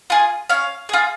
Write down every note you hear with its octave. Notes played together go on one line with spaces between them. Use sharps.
F4 G#4
C#4 F5
F4 G#4